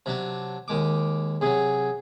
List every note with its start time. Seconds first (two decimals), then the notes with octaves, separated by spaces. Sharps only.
0.06 C3 F#3 D4
0.68 D#2 G#3 D6
1.41 C3 F#3 G#4